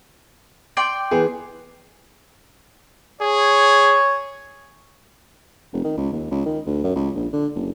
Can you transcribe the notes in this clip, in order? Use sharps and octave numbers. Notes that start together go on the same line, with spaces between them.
D5 G5 C6
E3 B3 G#4
G#4 C#5
F1
D#3
C#2
D#2
C#2
D#3
D2
F#2
C#2
A#1
D3
F#1